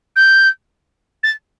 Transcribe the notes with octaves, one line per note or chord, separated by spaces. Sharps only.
G6
A6